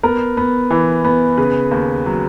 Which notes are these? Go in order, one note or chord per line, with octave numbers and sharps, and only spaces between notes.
B3 A#4
B3
E3
B3
C#3 B4
D#2
F#3